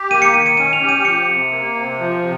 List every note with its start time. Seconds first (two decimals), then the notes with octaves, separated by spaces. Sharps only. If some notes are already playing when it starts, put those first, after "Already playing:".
Already playing: G4
0.10 A#3 D#7
0.22 C#7
0.34 D#3 D#7
0.46 D#7
0.57 C#4 D#7
0.73 F7
0.81 G4
0.89 D#7
1.05 F3 C#7
1.27 C3
1.51 A#3
1.75 C3
1.99 F3
2.22 C3